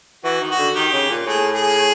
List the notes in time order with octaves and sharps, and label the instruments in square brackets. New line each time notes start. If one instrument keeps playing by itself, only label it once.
[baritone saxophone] E3 [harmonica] F#4
[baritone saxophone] D#3
[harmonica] F#4
[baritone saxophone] D3
[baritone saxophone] D#3 [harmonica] G4
[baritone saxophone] C#3
A#2
[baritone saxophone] A2 [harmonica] G#4
[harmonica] G#4